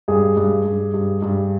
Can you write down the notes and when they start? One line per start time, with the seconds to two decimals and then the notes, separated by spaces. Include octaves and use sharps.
0.08 G2 G#4
0.37 G2
0.65 G2
0.94 G2
1.22 G2